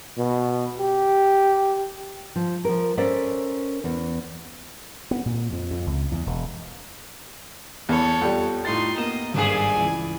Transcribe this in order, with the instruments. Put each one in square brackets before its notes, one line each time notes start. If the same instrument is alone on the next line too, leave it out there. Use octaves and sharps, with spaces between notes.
[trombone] B2
G4
[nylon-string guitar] F3
F3 A#4
C#4 A4 A#4 C5 D5 E5
E2
[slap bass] B3
A#2
F2
F2
C#2
E2
E1
[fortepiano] E2 [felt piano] B3 [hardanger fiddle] A4 C#5
[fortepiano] F2 G3
[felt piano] A2 F4 A6 [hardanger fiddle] D#4 C6
[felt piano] A#3 B3 E7 [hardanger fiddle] D#5
[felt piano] G#1 G2 [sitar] A3 A#3 G#4 [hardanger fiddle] D5 G#5
[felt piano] C#2 E3